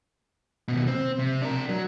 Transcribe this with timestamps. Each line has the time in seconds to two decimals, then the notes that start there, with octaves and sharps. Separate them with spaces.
0.68 D#2 B2
0.87 C4
1.19 C3
1.42 D4 A#4
1.69 F#3